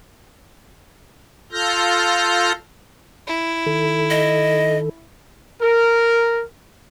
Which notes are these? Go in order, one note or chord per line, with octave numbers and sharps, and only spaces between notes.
F4 A4 F6 G6 A#6
E4
D#3 A4
D#5
A#4